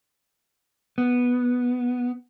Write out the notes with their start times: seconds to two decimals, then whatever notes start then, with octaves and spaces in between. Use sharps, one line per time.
0.98 B3